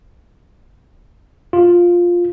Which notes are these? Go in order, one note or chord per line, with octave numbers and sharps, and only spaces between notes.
F4